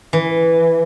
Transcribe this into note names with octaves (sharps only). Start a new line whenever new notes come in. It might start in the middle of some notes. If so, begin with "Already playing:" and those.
E3